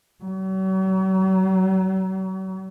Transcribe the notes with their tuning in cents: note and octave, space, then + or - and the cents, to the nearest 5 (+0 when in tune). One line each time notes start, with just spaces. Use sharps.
F#3 +40